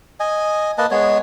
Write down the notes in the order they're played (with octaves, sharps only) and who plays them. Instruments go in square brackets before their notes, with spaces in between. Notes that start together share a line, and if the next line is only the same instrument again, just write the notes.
[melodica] D#5 G#5
A#3 B4 D#5 A5
G#3 B3 C#5